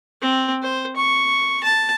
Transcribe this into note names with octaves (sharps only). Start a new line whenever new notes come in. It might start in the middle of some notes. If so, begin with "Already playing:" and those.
C4
C5
C#6
A5